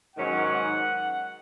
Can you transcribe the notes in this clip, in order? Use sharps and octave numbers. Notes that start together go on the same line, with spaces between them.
G#2 D#3 F#3 C#4 F#5